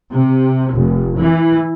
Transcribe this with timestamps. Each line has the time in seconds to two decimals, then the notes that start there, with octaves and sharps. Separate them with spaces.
0.13 C3
0.75 F1
1.18 E3